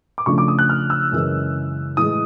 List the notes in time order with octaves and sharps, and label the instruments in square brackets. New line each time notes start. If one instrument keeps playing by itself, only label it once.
[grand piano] D6
[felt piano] C#3 F3 A3 D4 [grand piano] C#6
[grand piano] D6
D#6
F#6
F6
E6
[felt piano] F#2 C#3 E3 G#3 C#4
[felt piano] A2 E3 G#3 [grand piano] D#6